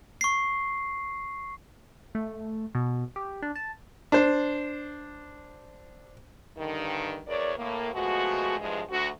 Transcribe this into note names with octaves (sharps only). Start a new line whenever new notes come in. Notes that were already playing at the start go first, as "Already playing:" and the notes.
C#6 C7
A3
B2
G4
D4
A5
D4 C5
G2 D3 D#3
E2 A#4 C#5 D5
A2 A#3
B2 F3 G#3 A3 F#4
G2 E3 F3 G#3
D2 F#4